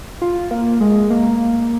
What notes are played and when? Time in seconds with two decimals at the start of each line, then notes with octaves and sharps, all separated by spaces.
0.22 F4
0.51 A#3
0.80 G#3
1.10 A#3